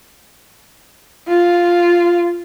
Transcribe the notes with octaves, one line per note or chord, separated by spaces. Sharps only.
F4